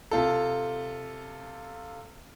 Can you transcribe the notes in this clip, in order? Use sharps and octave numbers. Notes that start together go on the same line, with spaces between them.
C3 F4 A4